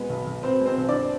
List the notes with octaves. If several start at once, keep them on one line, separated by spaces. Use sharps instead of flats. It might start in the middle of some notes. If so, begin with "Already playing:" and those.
Already playing: B2 G#3 B3 B4
B1
B1
B2 C4 C5
G#3
C4 C5
B1
D4 D5